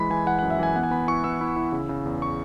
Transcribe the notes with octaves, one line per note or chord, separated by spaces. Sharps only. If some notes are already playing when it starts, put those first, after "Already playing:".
Already playing: E3 G#3 B5
E3 G#5
E3 F#5
F#5
F#2
E5
E3 G#5
B3 F#5
G#5
B3 B5
E4 C#6
B3 E6
E4
E4
C#3
C#3
E2
C#6